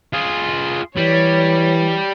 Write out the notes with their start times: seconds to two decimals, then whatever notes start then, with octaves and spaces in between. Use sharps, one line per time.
0.14 F4 G#4
0.97 E3 G3 C#5